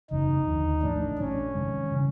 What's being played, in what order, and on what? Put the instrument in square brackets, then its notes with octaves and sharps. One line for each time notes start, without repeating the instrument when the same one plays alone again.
[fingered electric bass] F#1 E2 C#3 F#3 [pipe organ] D#4
[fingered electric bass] D#2 D3 F3
[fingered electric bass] A1 A2 F3 A3 [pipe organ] D4
[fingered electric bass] A1 A2 F#3 A3 [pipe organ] C#4
[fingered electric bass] F2 C3 D#3 G#3
C#3 E3 G3